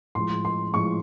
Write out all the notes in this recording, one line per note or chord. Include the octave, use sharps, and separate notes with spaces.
A2 F3 G#3 C6
C6
A2 F3 G#3 C#6